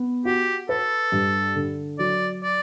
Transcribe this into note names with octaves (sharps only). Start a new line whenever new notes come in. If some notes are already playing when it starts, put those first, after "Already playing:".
Already playing: B3
F#4 G4
A4 B4
G2
D3
F#3 D5
D5